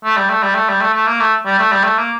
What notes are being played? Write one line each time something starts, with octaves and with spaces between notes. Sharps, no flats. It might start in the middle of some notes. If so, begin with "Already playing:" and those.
A3
G3
A3
G3
A3
G3
A3
A3
A#3
A3
G3
A3
G3
A3
A#3